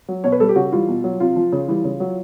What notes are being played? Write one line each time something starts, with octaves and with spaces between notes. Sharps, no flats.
F#3
B2 C#5
B4
G3 A4
G4
C#3 F#4
E3 G3 F4
B2
F#3
C3 F4
F3
C#3
E3 G3
C#3
F#3